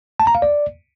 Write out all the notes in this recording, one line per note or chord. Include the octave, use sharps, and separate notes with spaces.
A5
A#5
F5
D5